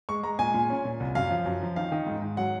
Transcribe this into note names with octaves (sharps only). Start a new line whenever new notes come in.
G#3 C#6
G#3 A#5
A#2 G#5
A#2
C#4
A#2
C2
F#2 F5
F3
F#2
F3
D#3 F5
D#3
G#2
G#2
F#3 F#5